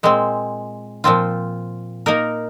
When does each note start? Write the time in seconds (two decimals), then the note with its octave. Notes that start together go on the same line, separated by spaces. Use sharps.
0.03 A#2 G#3 C4
1.04 A#2 F3 C4 F4
2.06 A#3 D#4 A#4